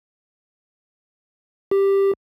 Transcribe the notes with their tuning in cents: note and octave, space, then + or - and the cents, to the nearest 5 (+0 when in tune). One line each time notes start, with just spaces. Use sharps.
G4 +5